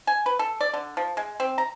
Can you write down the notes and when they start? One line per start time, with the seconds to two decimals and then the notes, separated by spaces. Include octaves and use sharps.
0.07 G#5
0.26 B4
0.39 A4
0.61 D5
0.74 D3
0.97 F3
1.17 G#3
1.40 C4
1.58 A#5